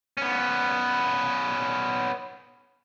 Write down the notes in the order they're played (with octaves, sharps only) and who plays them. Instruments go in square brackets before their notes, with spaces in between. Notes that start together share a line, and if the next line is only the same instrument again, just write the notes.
[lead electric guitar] B3 C#4